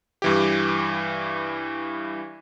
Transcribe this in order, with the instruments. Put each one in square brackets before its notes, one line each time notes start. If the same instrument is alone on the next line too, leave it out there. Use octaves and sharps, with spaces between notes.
[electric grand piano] G2 E3 G4